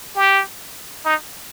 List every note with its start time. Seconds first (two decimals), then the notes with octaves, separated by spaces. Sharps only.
0.15 G4
1.05 D#4